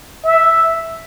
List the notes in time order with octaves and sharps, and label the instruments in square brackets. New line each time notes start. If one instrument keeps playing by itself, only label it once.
[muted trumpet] E5